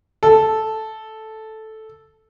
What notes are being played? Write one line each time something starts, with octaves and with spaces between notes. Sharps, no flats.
A4